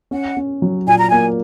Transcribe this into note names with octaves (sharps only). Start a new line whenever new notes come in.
C#4 F#5
C#4
F#3
A#2 G#5
A#5
A#3 G#5